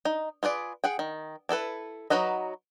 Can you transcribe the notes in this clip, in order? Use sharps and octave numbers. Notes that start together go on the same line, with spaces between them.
D#4
F4 G#4 B4 D5
G#4 F#5 G5
D#3
D4 E4 A4 B4
F#3 D#4 F#4 B4 D#5